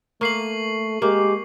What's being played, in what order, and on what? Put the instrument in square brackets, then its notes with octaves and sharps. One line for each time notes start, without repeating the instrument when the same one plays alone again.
[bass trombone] A3 [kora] A#3 [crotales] C#6 C7 F#7
[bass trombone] G#3 [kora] A#3 [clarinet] G4